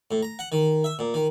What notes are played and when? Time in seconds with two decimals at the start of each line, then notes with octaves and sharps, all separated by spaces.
0.11 A2
0.23 A#5
0.39 F#5
0.52 D#3
0.84 E5
0.99 A#2
1.14 D#3